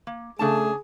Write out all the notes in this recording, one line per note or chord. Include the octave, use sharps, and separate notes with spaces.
A#3
C#3 A3 D4 G#4 A5